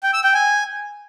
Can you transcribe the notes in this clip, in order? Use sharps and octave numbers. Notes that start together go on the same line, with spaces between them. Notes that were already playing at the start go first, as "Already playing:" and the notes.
G5
E6
G5
G#5